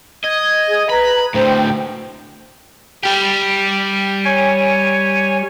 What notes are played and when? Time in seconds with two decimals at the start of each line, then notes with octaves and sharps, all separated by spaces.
0.24 D#5 G#6
0.69 G#4
0.89 B4 A#5 B5
1.34 D2 A2 C5 G5
1.56 G5
3.03 G3 G4
4.25 C#5 G#5